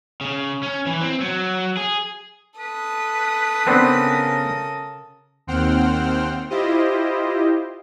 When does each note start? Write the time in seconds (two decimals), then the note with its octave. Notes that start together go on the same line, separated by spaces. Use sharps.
0.21 C#3
0.63 C#4
0.86 E3
1.01 C4
1.21 F#3
1.77 G#4
2.59 A4 B4 D#6
3.67 C#3 B3 C4 D4 A#4
5.47 D#2 C4 C5 F#5 G5 F6
6.50 E4 F4 G4 C5 D#5